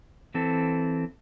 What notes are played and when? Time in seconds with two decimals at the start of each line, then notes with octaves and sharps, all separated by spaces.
0.34 E3 C4 A4